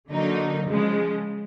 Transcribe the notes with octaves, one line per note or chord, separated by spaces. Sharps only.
D3 F#3 A#3 D#4
C#3 F3 G#3